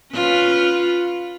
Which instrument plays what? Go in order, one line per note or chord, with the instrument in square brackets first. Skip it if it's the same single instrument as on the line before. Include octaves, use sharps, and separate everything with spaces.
[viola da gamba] C#4 F4 B4